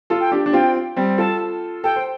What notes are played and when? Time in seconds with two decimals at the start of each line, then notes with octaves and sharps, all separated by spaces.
0.10 F4 A4
0.20 G5
0.32 D4 G4
0.46 D4
0.53 C4 F4 G5
0.96 G3 C4
1.18 F4 A4 A5
1.84 A4 G5
1.96 C5